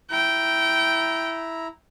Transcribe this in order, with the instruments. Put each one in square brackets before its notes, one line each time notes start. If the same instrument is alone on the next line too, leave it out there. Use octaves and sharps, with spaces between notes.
[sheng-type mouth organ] E4 A#5 [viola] G5